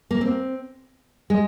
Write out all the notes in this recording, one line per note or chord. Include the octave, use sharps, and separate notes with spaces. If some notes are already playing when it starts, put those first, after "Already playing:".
A#3
C4
G#3